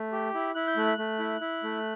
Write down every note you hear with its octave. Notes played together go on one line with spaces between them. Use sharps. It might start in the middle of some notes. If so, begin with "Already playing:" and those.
Already playing: A3
G4
E4
E4 F#6
G6
A3 F#6
A3
E4
E4
A3